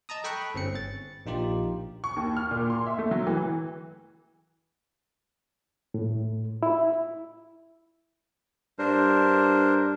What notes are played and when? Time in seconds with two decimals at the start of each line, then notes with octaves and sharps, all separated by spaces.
0.09 D#5 A5 A#5 D#6
0.24 A4 G5 B5 C#6 F#6
0.54 G1 C4 C#4 C#7
0.75 A6
1.26 A#1 D#4 F4 G4
2.04 C#6
2.16 D#2
2.37 F6
2.51 A#2
2.70 C6
2.86 E5
2.98 A3
3.11 F#3
3.27 E3
5.94 A2
6.63 E4
8.79 G2 D4 A#4 C5